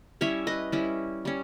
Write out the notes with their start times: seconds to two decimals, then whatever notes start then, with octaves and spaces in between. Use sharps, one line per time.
0.21 G3 C#4 E4 C#5 E5
0.47 B4 D#5
0.72 G3 C#4 E4
1.25 G3 C#4